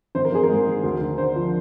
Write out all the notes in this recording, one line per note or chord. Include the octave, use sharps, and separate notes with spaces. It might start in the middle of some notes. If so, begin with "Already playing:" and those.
G#1 C5
A#4
G#1 G#4
A#4
G#2
D#3
D2
D2
D3 C5
F3